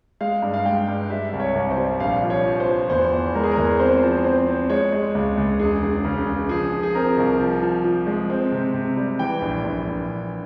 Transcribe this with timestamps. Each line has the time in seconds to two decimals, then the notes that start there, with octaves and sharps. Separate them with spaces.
0.21 G#3 F5
0.42 G2
0.54 F5
0.66 G#3 G5
0.88 G2
1.10 G3 E5
1.29 C2 E5
1.40 C#5
1.55 C2
1.70 C5
1.77 G3
2.00 A#1 F5
2.23 F3
2.30 C#5
2.45 F3
2.60 C5
2.68 F3
2.90 E2 C5
3.12 E2
3.35 G#3 A#4
3.44 G#4
3.51 A#4
3.58 E2
3.79 C4 C5
4.03 F3
4.24 C4 C5
4.47 C4
4.70 G#3 C#5
4.92 G#3
5.15 C#2
5.37 C#2
5.59 E1 G#4
5.82 E1
6.04 C#3
6.27 E1
6.49 F3 G#4
6.72 F3
6.83 G#4
6.95 C4 A#4
7.17 C2
7.40 F3
7.62 F3
7.84 F3
8.07 G#3
8.30 C4
8.52 C3
8.74 C3
8.96 G3
9.19 E3 G5
9.41 A#1
9.64 A#1
9.87 A#1